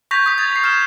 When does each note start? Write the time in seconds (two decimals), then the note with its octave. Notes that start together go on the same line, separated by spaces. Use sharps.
0.11 C#6 G6 G#6 A#6 B6 F7
0.26 D#6 B6
0.38 G#6 A6
0.51 B6 C7
0.64 F6 E7